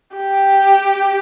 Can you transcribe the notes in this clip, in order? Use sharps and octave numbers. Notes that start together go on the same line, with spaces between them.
G4